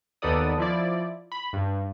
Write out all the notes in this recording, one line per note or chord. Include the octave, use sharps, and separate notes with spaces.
D#2 B3 D#4 A4 D5 D#6
F3 E4 D5
B5
G2